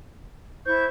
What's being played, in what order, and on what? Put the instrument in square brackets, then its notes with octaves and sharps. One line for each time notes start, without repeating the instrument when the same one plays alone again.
[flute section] E4 C#6 G6 [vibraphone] C5